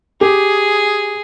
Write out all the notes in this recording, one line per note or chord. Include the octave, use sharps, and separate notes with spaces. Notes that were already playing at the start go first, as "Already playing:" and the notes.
G4 G#4